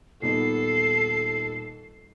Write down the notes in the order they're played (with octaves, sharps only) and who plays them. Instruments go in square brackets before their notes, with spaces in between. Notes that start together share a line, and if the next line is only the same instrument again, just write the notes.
[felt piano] D#1 B3 D#4 [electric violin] A4 [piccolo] C7